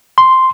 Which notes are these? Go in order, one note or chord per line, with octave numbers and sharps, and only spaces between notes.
C6